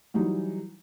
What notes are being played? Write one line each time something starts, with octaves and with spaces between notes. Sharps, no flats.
E3 F#3 G3 D#4